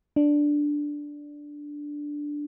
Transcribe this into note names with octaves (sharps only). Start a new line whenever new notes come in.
D4